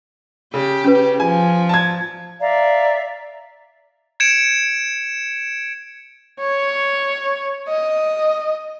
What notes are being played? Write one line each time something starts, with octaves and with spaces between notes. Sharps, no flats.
C#3 G4
C#4 F4 B4
F3 G#5
A5 G#6
D5 E5 F5 A#5
G#6 C#7 D7 E7
C#5
D#5